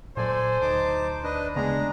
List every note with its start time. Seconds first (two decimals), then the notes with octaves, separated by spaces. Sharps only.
0.17 A#2 F#3 A4 C5 D5 G#5
0.62 D2 D#4 A5 D6
1.23 D4 B4 D#5
1.56 C#3 G#3 A3 B3 D4 A#5